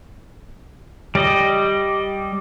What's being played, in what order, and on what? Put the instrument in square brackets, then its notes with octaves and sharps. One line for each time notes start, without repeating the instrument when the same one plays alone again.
[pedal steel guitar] G3 D5 D#5